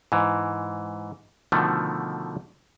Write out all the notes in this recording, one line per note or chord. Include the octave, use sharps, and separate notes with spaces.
G#2 E3
B2 D3 D#3 F3 A3